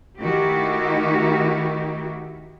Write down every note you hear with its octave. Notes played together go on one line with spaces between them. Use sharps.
D#3 A3 D#4 E4 F#4 G4